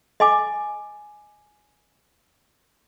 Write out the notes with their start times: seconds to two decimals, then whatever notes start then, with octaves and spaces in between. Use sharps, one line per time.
0.20 D#5 G#5 D6